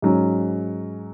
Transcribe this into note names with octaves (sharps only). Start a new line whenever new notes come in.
G#2 F#3 C#4